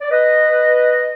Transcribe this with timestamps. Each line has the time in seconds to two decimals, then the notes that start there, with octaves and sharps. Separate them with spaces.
0.01 D5
0.11 B4 D#5